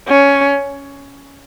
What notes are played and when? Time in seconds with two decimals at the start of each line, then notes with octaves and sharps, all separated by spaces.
0.08 C#4